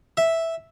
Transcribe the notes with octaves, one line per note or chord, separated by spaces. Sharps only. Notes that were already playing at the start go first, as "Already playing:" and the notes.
E5